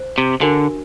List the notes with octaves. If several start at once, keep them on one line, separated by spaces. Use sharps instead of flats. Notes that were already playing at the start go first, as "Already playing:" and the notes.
Already playing: C5
C3
D3 D4 F#4 A#4